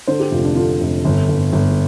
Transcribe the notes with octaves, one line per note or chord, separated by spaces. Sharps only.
D3 C5
G4
F1 F4
D4
D3 F4
F1
G1
G1
G1